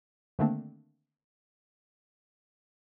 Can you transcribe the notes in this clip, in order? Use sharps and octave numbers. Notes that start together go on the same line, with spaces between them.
D3 D#3 A3 A#3 C4 D4